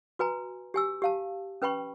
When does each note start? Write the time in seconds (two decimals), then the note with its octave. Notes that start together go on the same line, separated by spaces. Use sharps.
0.19 F#4 B4 G#5 A#5
0.74 G4 G#5 E6
1.02 G4 F5 A5
1.62 C#4 B4 G5 B5 C#6